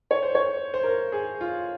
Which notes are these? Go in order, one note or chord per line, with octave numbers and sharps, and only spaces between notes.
C#5
C5
C#5
C5
A#4
G#4
F4